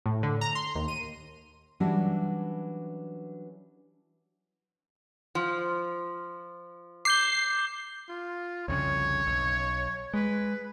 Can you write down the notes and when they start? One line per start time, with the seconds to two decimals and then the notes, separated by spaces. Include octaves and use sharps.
0.06 A2
0.23 D3
0.41 A#5
0.55 C6
0.75 D#2
0.88 D#7
1.80 E3 F#3 G3 C#4 D4 F#4
5.35 F3
7.05 D6 G6 C7 G7
8.09 F4
8.68 C2 F2 C#3 C#5
9.27 B1
10.14 G#3 B4